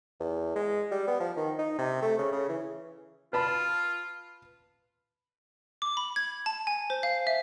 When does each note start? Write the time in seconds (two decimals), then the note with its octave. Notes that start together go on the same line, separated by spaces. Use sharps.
0.20 E2
0.56 G#3
0.91 G3
1.07 B3
1.20 F3
1.37 D#3
1.59 D#4
1.79 C3
2.02 A3
2.19 C#3
2.32 C#3
2.49 E3
3.33 F4 B4 A5 B5
5.82 D6
5.97 B5
6.16 G#6
6.46 A5
6.67 G#5
6.90 C5
7.03 F5
7.27 E5